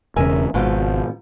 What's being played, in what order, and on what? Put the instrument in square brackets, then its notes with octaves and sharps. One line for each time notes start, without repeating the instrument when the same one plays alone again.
[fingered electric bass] E1 E2 C#3 [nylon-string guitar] A#4 E5 G#5
[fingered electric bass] G#1 [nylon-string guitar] G#2 B2 F3